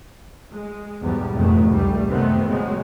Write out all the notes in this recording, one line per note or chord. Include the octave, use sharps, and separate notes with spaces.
G#3
B1 E2 G#2 G3
F1 A#1 G#2 D#3 E3 A3
C#2 G3 A3
F#2 C3 D#3 A3 B3 C4
A#2 C#3 F#3 G#3